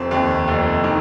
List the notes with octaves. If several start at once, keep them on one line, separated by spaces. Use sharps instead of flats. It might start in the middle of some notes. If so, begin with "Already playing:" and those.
Already playing: F1 C4
D#2
F1
D#3